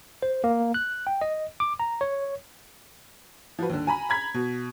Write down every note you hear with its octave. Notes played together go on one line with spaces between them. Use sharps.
C5
A#3
F#6
G5
D#5
D6
A#5
C#5
F3 F#4 B4
D#2 D3
G#5 A#5 B5
A#5 B5 G#6 B6
B2